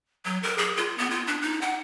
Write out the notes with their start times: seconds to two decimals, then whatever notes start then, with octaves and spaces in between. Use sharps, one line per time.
0.25 F#3
0.43 A#4
0.58 G#4
0.77 F4
0.98 B3
1.10 F4
1.27 D4
1.42 D#4
1.62 F#5